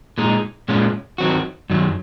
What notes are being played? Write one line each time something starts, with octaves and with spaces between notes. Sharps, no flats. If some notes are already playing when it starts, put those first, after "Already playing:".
A#2 G#3 D#4
A#2 G#3 C#4 F4
D#3 F#3 C4 F#4
F#2 D#3 F#3